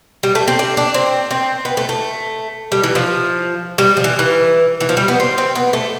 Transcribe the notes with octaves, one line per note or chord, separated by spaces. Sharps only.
G3
A3
C4
D4
D4
C4
C4
B3
A3
A3
G3
E3
F3
G3
F3
E3
E3
E3
F3
G3
B3
C4
C4
B3
A3